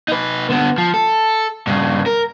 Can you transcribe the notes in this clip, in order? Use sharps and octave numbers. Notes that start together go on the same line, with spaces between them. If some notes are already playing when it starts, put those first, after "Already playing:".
D#4 B4
D3 B3
F3
A4
G2 C#3
A#4